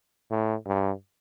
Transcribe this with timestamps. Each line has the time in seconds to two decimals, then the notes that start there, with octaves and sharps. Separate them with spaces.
0.31 A2
0.66 G2